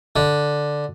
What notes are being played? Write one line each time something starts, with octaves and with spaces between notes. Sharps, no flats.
D3